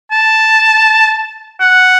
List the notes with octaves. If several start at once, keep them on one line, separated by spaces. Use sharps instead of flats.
A5
F#5